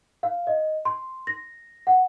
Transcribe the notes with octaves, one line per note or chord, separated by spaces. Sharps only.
F5
D#5
C6
A#6
F#5